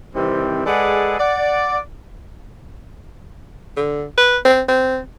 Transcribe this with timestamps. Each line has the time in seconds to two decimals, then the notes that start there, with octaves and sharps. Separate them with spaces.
0.14 C3 D#3 E3 G3 C4
0.66 G#3 G#4 A4 B4 D5 F#5
1.19 D5 F#5
3.77 D3
4.18 B4
4.45 C4
4.68 C4